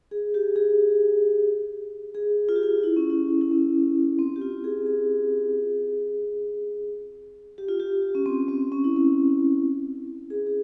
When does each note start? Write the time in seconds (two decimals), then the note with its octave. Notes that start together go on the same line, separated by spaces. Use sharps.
0.11 G#4
0.34 G4
0.56 G#4
2.15 G#4
2.49 F4
2.56 G4
2.63 F4
2.83 E4
2.96 C#4
3.10 E4
3.41 E4
3.51 C#4
4.19 C4
4.36 G4
4.42 F4
4.64 G#4
4.86 G#4
7.58 G4
7.69 F4
7.80 G4
8.15 C#4
8.26 C4
8.49 C4
8.72 C#4
8.84 E4
8.96 C#4
10.30 G#4
10.46 G#4